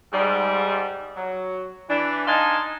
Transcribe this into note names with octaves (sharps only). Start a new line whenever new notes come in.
G#2 G3
F#3
E3 D4
D4 D#4 F5 G#5 A5 C6